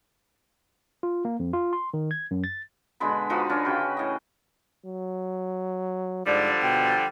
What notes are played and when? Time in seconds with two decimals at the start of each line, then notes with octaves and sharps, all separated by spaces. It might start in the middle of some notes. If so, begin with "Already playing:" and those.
1.03 F4
1.25 A#3
1.39 F2
1.53 F4
1.73 C6
1.94 D#3
2.11 G#6
2.31 F#2
2.44 A6
3.00 B2 D3 G#3 B5
3.30 F3 D#4 F#4 B4
3.50 D3 C#4 D4
3.65 C#3 F#4 G5
3.97 A2 D#5
4.85 F#3
6.26 G#2 D3 F3 G3 D5
6.62 B2 G5